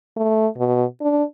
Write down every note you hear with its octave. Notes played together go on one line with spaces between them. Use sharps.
A3
B2
D4